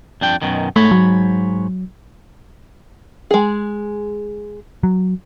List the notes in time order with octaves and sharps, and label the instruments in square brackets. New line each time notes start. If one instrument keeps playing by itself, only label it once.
[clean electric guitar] F2 D4 G5
F#2 B2 D#3
[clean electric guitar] G#2 C#5 B5 [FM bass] A3
[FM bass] F#3
[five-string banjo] G#3 G#4
[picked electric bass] F#3